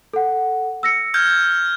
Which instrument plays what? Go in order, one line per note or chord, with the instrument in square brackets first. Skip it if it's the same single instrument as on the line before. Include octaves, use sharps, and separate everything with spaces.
[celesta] A4 F#5
E6 A#6 C#7
[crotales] F6 G6 G#6